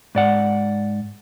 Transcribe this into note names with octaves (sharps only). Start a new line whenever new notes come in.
G#2 D5 F#5